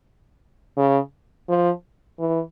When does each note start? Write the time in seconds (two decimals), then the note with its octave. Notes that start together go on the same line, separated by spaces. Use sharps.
0.77 C#3
1.49 F3
2.19 E3